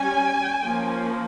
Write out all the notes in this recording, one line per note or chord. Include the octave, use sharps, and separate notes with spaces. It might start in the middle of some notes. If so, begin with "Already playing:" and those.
Already playing: G3 C#4 G#5
F3 A#3 C#4